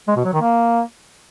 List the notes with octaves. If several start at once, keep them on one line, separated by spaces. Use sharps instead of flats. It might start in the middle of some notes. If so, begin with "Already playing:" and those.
G#3
B2
F#3
D#3
A#3